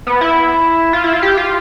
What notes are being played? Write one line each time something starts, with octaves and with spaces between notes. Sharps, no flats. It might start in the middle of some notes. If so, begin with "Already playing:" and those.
B3
E4
F4
E4
F4
G4
F4